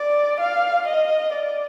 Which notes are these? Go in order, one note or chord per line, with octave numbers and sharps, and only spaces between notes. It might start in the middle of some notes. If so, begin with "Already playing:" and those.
Already playing: D5
F5
D#5
D5